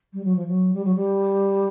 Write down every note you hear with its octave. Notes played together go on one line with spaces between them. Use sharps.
G3
F#3
F3
F#3
G3
F#3
G3